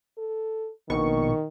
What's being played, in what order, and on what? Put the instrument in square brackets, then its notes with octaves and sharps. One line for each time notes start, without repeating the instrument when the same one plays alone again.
[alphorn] A4
[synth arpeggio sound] A#1 B2 C#6 [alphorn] D#3